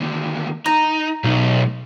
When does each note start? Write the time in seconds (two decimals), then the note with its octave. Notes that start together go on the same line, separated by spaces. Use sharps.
0.01 D#2 D3
0.66 D#4 A#5
1.24 B1 A3 D#4